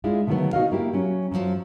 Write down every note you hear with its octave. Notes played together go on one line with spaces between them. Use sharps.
G#3 D4 E4 F4
B2 D3 D#3 F#3 A3 B3
D#4 F#4 D#5 F5
A#3 E4 G4
F#3 C#4
F#2 D3 D#3 F3 F#3